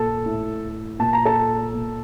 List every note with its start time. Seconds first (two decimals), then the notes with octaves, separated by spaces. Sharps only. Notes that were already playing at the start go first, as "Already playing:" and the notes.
Already playing: A#2 A4 A5
0.25 A2
0.99 A#2 A5
1.13 A#5
1.25 A4 A5
1.74 A#2